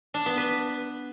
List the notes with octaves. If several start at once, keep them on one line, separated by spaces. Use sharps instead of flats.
D4
B3
B4